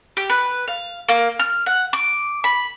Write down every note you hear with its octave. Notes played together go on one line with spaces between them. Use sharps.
G4
B4
F5
A#3
F6
F#5
D6
B5